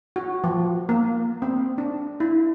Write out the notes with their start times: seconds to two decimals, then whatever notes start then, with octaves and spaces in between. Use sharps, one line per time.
0.16 F#4
0.44 F3
0.89 A#3
1.42 C4
1.78 D4
2.20 E4